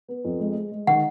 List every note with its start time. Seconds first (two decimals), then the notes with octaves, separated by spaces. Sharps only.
0.08 B3
0.25 F2
0.40 G#3
0.56 G#3
0.72 G#3
0.87 D#3 F#5